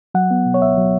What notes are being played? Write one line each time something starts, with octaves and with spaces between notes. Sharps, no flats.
F#3 F#5
B3
B2
C#5
C#2 E5
F#3